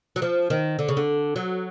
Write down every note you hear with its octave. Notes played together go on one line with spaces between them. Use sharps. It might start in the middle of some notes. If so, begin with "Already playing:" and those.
F#3
F3
D#3
D3
C#3
D3
F#3